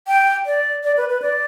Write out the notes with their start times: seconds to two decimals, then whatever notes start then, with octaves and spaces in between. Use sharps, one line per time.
0.08 G5
0.46 D5
0.83 D5
0.97 B4
1.09 B4
1.22 D5